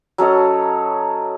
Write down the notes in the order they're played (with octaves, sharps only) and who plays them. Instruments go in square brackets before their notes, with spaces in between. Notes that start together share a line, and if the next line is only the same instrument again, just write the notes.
[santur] F#3 C#4 A4 D#5